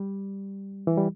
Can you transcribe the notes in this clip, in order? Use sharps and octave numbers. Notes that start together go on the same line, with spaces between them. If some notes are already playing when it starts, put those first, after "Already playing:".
Already playing: G3
E3
G3